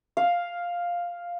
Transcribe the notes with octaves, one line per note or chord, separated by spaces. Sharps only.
F5